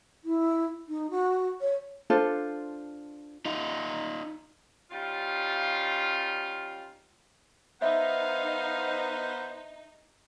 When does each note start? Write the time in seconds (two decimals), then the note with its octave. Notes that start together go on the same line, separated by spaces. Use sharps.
0.24 E4
0.88 D#4
1.10 F#4
1.61 C#5
2.10 D4 F4 A4 C5
3.46 D#4 F4
4.91 G3 C#4 D#4 F4
7.82 B3 D#4 C5 E5 F5